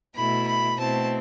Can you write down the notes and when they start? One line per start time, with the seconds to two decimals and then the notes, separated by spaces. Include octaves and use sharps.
0.15 B2 A3 E4 B5
0.46 B5
0.77 B2 A3 C4 E4 A5